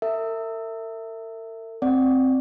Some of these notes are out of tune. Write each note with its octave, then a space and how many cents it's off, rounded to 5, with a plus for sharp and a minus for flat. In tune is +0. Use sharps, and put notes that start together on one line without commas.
A#4 -45 E5 +0
C4 +0 D5 +0 F#5 +0